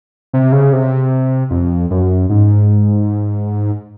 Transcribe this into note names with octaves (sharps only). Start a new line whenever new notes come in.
C3
C#3
C3
F2
F#2
G#2